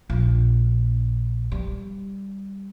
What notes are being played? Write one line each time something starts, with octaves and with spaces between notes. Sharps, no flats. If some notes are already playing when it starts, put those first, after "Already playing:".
A#1 D4
G3